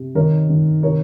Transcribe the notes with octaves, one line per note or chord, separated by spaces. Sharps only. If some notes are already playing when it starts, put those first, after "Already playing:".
Already playing: C3
D#3 A#4 C#5
D#3
C3 A#4 C#5